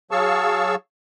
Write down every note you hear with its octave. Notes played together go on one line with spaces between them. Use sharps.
F#3 G#4 F5 A5 C#6 E6